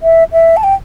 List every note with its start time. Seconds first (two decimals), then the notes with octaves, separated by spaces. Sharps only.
0.03 E5
0.32 E5
0.57 A5
0.64 G5